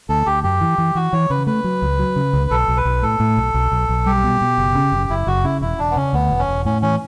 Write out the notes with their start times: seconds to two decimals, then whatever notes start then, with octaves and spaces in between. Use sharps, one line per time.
0.09 D2 A4
0.26 D2 G4
0.43 F#2 G4
0.61 E3
0.78 E3
0.95 E3 F#4
1.13 E3 C#5
1.30 C#3 B4
1.47 A3 B4
1.64 F#3
1.82 C#2
1.99 F#3
2.16 C#3
2.33 C#2
2.51 B1 A4
2.68 B1
2.77 B4
2.85 B1
3.03 A2 A4
3.20 A2
3.37 B1
3.54 B1
3.72 B1
3.89 B1
4.06 G3 G4
4.24 B2
4.41 B2
4.58 F#1
4.75 C#3
4.92 F#1
5.10 F#1 E4
5.27 F#1 F#4
5.44 C#3 E4
5.61 E1 E4
5.79 E1 D4
5.91 B3
5.96 C#3 C#4
6.13 D2 B3
6.30 E1
6.39 C#4
6.48 E1
6.65 A2 C#4
6.82 E3 C#4